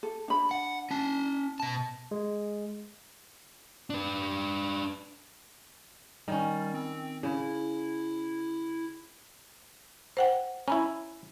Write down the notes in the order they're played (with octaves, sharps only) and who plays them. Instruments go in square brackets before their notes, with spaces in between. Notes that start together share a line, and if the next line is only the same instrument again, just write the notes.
[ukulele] A4
D4 B5
[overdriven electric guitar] F#5
C#4 A5
B2 A5
[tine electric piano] G#3
[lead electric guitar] D4 B4
[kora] D#3 C#4 [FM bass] G3
[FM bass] C4
[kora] C#3 [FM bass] E4
[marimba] C5 F#5 G5
[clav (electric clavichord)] C#4 E4 [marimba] A#5 B5